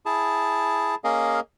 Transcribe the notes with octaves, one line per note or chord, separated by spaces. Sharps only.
E4 G#4 A5
A#3 C#4 G#4 A#4 D#5 F5